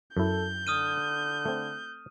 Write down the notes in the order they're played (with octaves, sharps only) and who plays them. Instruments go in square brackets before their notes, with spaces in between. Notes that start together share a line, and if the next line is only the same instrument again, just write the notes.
[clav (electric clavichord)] F#2 E4 [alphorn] A4 [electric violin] G6
[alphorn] D3 [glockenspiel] D#6 F6 D#7
[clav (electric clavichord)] A3 C4